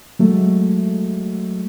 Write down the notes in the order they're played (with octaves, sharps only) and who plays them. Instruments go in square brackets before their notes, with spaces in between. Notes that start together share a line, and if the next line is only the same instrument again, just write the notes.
[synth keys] F#3 G#3 A3